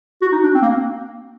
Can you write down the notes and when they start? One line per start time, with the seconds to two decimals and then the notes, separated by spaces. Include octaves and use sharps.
0.22 F#4
0.32 D#4
0.43 D4
0.55 C4
0.62 A#3